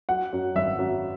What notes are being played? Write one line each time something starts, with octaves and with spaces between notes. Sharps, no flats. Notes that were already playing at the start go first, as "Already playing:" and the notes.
F#3 F#5
F#2
G#1 E5
F#2